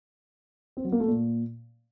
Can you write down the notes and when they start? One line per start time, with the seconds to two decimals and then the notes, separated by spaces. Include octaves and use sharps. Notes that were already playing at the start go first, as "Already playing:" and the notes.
0.77 C4
0.85 F#3
0.92 A#3
1.00 A3
1.08 A#2